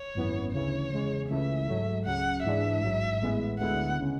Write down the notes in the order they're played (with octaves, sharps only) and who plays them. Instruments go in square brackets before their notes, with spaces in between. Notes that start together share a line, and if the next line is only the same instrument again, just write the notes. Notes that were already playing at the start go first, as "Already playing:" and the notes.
Already playing: [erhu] C#5
[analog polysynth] G#1 F#2 E3 B3
[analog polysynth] D2 C#3 E3 [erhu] C#5
[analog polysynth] E2 C#3 G#3
[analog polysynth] C#2 C#3 E3 A3 [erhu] E5
[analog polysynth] G#2 F#3 A3
[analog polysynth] C#2 C#3 F#3 [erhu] F#5
[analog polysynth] G#2 E3 G#3 D4 [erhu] E5
[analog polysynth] A1 G#2 F#3
A1 A2 G#3 B3
[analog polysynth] D2 D3 G#3 B3 E4 [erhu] F#5
[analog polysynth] C#3 G#3